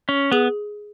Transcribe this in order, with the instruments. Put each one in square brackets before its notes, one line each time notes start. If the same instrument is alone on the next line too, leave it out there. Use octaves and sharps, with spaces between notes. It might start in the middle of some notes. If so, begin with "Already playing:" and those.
[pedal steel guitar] C#4
[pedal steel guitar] B3 [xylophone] G#4